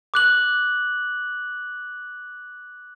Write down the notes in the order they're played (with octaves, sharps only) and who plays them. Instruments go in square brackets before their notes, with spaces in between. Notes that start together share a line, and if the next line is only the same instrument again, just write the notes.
[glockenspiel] D6 F#6 F#7